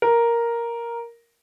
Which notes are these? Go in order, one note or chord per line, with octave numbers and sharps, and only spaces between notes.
A#4